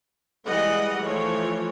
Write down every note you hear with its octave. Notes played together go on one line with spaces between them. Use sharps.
E3 G3 G#3 G#4 D#5 F#5
E3 F3 A3 C#5